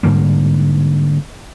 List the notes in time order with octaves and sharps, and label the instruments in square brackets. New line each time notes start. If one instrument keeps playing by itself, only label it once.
[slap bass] G#2 D3 G3 A#3